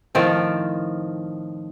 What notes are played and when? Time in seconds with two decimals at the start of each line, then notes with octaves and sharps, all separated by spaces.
0.15 A2 D#3 F3 C4